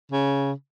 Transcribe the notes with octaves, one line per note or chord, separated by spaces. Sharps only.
C#3